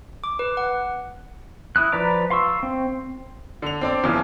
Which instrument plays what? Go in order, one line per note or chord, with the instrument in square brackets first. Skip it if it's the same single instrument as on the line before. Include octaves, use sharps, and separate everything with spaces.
[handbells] D6
B4
F#5
[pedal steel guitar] E4 D#6 F#6
F3 B4 D5 A#5 D6
F5 C6 C#6 E6
C4
[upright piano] D3 F7
C4 D4 D5
E2 C#3 E3 F3